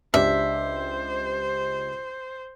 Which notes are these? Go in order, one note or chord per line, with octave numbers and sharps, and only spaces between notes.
C#2 D4 G4 C5 E5